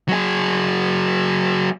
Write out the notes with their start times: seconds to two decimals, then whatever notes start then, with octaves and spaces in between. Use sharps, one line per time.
0.08 F#3 G#4